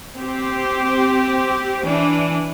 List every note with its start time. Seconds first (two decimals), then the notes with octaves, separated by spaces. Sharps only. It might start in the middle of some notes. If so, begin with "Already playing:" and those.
0.14 C4 G4
1.84 E3 D4